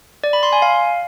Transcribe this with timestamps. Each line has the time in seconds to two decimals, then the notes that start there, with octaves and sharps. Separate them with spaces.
0.24 D5
0.33 B5
0.43 C6
0.53 G#5
0.62 F5